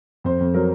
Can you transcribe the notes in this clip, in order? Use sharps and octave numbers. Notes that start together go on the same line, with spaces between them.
F2 C5
F2
F#3 A#4